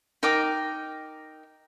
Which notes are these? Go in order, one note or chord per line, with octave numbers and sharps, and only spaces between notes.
D#4 A#4 G5 D6